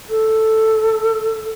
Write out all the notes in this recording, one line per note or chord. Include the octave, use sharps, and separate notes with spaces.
A4